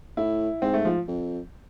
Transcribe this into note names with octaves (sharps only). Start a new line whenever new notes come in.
A2 E4
G#2 C4
A3
F3
F2